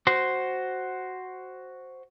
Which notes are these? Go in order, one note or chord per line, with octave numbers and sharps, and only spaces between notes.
F#4 C5